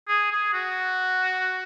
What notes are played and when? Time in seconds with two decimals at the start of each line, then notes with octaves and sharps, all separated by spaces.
0.08 G#4
0.32 G#4
0.53 F#4